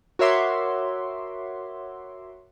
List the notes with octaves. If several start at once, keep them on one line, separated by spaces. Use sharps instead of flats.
F#4 A#4 C#5 E5 C6 D6